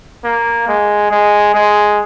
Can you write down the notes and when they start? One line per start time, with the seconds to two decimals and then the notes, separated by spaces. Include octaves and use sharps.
0.24 A#3
0.68 G#3
1.11 G#3
1.54 G#3